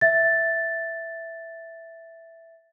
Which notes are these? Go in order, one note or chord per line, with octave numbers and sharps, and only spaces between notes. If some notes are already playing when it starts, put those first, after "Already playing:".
E5 A6